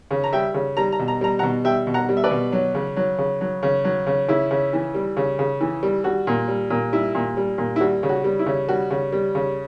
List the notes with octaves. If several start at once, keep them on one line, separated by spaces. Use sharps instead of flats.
C#3
A#5
G3 E5 G5
C#3
G3 A#5
A#5
B2
A#5
G3 A#5
F#5 A#5
B2
G3 E5 G5
B2
F#5 A#5
G3
E5
B4 D5
B2
F#3
C#3
F#3
C#3
F#3
C#3
F#3
C#3
C#3 E4
C#3
E3
G3
C#3
C#3
E3
G3
G3 F#4
A#2
G3
A#2
G3 E4
A#2
G3
A#2
E4
G3 F#4
C#3
F#4
G3
E4
C#3
G3 F#4
C#3
G3
C#3